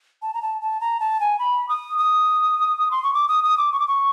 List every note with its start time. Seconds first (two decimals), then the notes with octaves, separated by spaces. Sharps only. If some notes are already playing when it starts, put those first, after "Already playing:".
0.22 A5
0.34 A#5
0.42 A5
0.61 A5
0.81 A#5
1.00 A5
1.20 G#5
1.39 B5
1.69 D#6
1.98 D#6
2.91 C6
3.03 C#6
3.14 D6
3.28 D#6
3.44 D#6
3.58 D6
3.72 C#6
3.80 D6
3.88 C#6